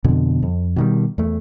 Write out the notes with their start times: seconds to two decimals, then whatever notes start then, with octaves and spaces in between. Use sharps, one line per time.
0.04 F2 B2 D3
0.42 F2
0.76 B2 D#3 G3
1.18 E2 A3